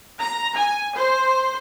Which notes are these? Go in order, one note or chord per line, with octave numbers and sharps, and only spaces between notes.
A#5
G#5
C5